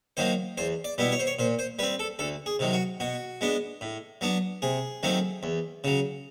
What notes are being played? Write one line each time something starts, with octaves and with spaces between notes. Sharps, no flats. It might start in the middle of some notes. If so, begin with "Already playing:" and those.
D#3 F#3 A#3 C5
E2 C5
D5
B2 G3 B3 E4
C#5
C5
C#5
A#2 C5
C5
G3 C4 B4
A4
D2 A4
G#4
C3 D#3 F#3
F#4
B2 F#4
G#3 B3 D4
A2
F#3 B3 D4
C3 G#4
D#3 F#3 A3 C4
E2
C#3 F#3